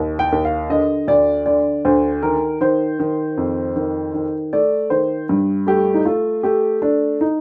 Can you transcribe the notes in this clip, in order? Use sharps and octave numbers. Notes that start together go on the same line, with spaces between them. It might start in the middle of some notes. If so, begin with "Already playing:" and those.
Already playing: D#2
G5
D#2
F5
D3 D#5
D2 D5
D3 D5
D2 C5
D#3 A#4
D#3 C5
D#3
F2
D#3
D#3
A3 D5
D#3 C5
G2
A3 G4
D#4
A3 F4
A3 G4
A3 D4
D#4